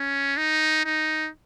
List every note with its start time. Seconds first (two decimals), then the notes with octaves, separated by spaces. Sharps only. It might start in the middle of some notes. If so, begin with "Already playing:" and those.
Already playing: C#4
0.37 D#4
0.85 D#4